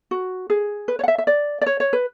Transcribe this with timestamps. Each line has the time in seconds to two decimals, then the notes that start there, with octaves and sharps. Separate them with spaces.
0.11 F#4
0.50 G#4
0.88 B4
0.99 C#5
1.04 F#5
1.08 E5
1.18 E5
1.27 D5
1.61 D5
1.66 C#5
1.80 C#5
1.93 B4